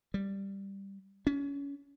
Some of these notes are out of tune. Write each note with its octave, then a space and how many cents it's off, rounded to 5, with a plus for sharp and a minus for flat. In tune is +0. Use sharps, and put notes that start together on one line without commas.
G3 +5
C#4 +25